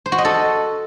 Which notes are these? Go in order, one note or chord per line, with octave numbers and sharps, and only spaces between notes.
C5
F#4
D#5
A4